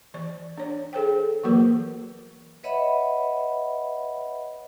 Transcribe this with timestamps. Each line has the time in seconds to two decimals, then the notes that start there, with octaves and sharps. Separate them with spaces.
0.14 E3 D5
0.58 D4 C#5
0.93 G#4 A4 C5 G5
1.44 E3 F#3 A#3 F#4 A#4 B4
2.64 B4 C#5 D#5 E5 F#5 B5